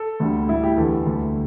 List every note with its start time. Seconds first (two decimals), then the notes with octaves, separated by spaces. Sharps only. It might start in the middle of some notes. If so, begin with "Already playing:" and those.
Already playing: A4
0.20 D2 D3 G3
0.49 A2 G3 E4
0.63 G4
0.77 E2 D3 G3 A4
1.06 D2 D3 G3